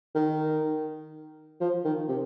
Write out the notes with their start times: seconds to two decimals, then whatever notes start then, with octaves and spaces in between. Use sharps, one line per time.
0.15 D#3
1.61 F3
1.85 D#3
2.08 C3